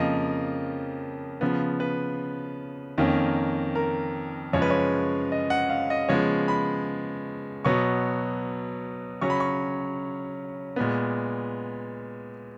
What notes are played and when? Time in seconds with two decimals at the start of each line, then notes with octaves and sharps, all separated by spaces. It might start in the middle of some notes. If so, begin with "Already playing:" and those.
Already playing: F2 C#3 F3 A#3 D#5
1.41 C#3 F3 B3
1.80 B4
2.98 F2 D#3 A#3 C#4
3.75 A#4
4.53 F#2 C#3 F3 G#3 C#4 C#5
4.62 B4
4.70 C#5
5.32 D#5
5.50 F#5
5.70 F5
5.90 D#5
6.09 C#3 F3 G#3 B3 C#5
6.48 B5
7.65 B2 F#3 B3 C#6
9.21 C#3 F#3 C#4 C#6
9.30 B5
9.40 C#6
10.76 A#2 G#3 B3